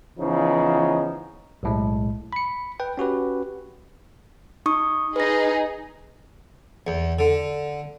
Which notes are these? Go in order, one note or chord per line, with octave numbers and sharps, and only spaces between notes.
C#3 E3 F3 B3 D#4
B1 A2 G#3
B5 C#7
B4 G5
C#4 F#4 G4 B4
D#4 C#6 D#6
D#4 G#4 B4 D#5 A#6
E2
D3